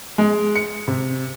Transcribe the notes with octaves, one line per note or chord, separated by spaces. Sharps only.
G#3
C#7
C3